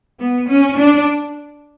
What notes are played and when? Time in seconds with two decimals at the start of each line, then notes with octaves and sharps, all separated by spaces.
0.19 B3
0.49 C#4
0.78 D4